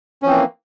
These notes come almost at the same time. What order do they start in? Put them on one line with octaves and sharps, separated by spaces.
C#4 F3 C4 E3 A#3